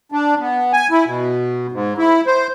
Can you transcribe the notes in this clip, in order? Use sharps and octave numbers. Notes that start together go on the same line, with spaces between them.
D4
B3
G#5
E4
B2
G#2
E4
C5